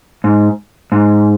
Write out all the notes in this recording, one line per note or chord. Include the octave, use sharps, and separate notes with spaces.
G#2
G#2